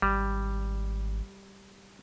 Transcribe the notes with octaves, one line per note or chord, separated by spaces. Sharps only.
G#1 G3